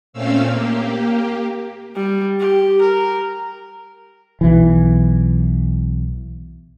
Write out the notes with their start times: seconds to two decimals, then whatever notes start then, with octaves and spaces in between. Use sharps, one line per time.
0.13 A#2 A3 C4 C#4 F5 E6
0.48 A#3 G4
1.95 G3
2.40 G4
2.82 A#4
4.41 B1 E3